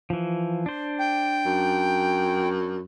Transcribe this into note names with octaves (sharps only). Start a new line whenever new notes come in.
E3 F3
D4 C5
G5
F#2